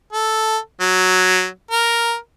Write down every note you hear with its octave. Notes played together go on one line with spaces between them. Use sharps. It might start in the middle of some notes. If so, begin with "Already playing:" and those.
A4
F#3
A#4